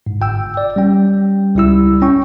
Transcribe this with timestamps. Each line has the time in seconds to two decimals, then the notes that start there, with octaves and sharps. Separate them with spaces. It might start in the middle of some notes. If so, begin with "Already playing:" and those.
0.06 G#2
0.21 G1 G5 E6
0.57 D5
0.76 G3 C#4 G5
1.55 C#2 G3 E4 E6
2.02 C#4 G5 C#6